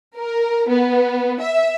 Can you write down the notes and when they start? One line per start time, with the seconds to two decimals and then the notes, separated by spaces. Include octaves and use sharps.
0.17 A#4
0.69 B3
1.41 E5